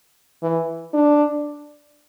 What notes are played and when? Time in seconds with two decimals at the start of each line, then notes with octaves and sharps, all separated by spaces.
0.42 E3
0.94 D4